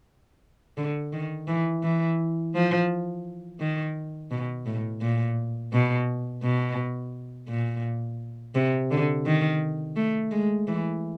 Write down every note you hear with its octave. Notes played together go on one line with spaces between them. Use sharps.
D3
D#3
E3
E3
F3
D#3
B2
A2
A#2
B2
B2
A#2
C3
D3
D#3
A3
G#3
E3